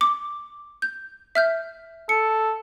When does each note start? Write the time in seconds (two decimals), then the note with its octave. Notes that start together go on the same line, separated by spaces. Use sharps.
0.01 D6
0.82 G6
1.35 E5 F6 G6
2.09 A4 C#7